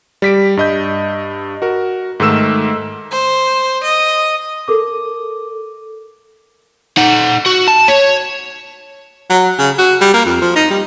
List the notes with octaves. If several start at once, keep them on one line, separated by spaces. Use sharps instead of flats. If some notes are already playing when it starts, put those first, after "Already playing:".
G3 B6 D7
G2 D#5 G6
F#4 A#4
G#2 D#3 A3 E6 E7
C5
D#5
A4 A#4 D6
D#4 F#5
F#4
A5
C#5
F#3
C#3
F#4
G3
A#3
F2
F3
D#4
G3